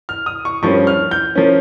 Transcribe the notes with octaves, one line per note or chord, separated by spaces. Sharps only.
F6
D#6
C#6
G2 F3 A#3 C#4 C#6
F6
G6
F3 A#3 C#4